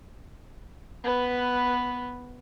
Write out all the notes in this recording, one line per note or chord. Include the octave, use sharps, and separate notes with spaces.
B3 B4